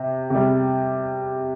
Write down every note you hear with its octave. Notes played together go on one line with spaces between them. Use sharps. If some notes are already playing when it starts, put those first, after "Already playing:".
Already playing: C3
C3 G3